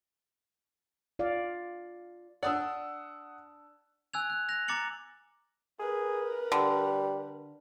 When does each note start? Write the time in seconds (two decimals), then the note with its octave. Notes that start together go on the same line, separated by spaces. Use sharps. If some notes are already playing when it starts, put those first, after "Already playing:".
1.19 F4 D5 F5
2.43 D4 D5 F#5 D#6 E6
4.13 G#5 E6 F#6 G#6 F7
4.30 F#6
4.49 F#6 A#6 F7
4.68 A#5 D6 A6 C#7 F#7
5.79 G#4 A#4 B4
6.52 D3 G3